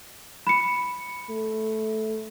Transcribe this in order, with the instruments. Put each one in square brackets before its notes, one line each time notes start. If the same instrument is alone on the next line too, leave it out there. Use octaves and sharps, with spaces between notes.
[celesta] B5 C#7
[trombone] A3